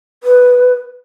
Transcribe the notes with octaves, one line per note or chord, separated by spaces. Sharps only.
B4